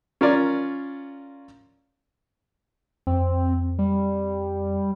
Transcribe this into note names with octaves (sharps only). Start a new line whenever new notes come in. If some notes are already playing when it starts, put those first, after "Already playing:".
C#4 F4 A#4 C#5 D5
F2 C4
G3